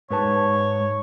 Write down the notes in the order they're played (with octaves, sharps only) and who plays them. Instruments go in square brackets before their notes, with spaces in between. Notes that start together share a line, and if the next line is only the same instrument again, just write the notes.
[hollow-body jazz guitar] G#2 B4 A5 [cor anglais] C#5